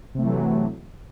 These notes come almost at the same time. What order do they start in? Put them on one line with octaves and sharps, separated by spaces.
C3 A3 E3 F#3